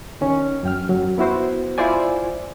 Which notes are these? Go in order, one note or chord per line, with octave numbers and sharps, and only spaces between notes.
D#3 C#4
F#2 G5 F6
F#2 F#3
B3 E4 F#4 C5
E4 F4 C5 D5 G#5